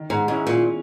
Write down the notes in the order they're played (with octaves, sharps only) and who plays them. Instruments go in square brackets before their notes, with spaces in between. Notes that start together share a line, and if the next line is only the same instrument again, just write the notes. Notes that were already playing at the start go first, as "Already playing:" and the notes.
Already playing: [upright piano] D#3
[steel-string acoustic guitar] G#2
[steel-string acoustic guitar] G#2 [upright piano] G#3 C#4 E4
[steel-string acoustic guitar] A#2